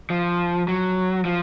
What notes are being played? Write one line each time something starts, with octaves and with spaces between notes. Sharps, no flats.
F3
F#3
F3